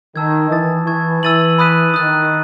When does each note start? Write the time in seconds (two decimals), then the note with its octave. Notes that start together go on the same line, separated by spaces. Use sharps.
0.16 D#3 A5 E6 G#6
0.51 E3 A5 D#6 A6
0.87 E3 A5 C#6 G#6
1.23 E3 E6 A6 D#7 F#7
1.59 B5 D#6 F#6 B6 D#7
1.94 D#3 D#6 F#6 A6